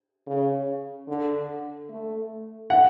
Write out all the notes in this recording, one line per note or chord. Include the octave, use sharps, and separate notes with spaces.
C#3
D3
A3
F#5